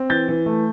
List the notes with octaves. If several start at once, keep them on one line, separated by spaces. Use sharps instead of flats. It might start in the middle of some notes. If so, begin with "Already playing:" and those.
Already playing: C4
E3 G6 A6
E3
A3